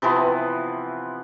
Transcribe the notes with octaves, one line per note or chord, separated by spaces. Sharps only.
C3 E3 F3 B3